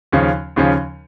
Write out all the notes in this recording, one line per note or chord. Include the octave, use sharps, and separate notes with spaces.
D#2 C#3 F3 C#4
D#2 C#3 F3 C#4